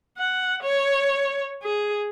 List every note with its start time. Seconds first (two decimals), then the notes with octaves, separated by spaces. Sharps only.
0.17 F#5
0.63 C#5
1.62 G#4